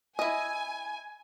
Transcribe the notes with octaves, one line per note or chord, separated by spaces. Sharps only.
E4 D#5 G#5